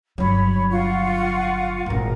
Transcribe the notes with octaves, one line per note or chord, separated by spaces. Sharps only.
G1 F#3 C#5 B5
F4 F#5 C#6
G#1 A#2 A#4